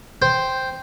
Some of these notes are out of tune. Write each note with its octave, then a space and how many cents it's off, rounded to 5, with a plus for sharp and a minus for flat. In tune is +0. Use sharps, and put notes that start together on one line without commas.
C5 +0 G5 +0